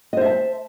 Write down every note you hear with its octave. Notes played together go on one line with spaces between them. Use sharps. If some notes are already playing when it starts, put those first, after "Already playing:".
C5 D#5 E5 A5